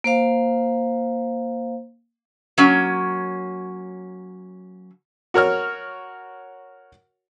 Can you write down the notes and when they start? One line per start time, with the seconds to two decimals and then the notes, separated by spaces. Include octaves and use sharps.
0.04 A#3 C5 F5
2.58 F#3 A#3 C#4
5.34 F#4 A#4 C#5 F6